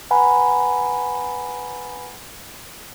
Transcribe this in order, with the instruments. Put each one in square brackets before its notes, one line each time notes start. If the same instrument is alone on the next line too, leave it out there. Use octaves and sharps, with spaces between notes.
[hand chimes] B4 F#5 G#5 A#5 B5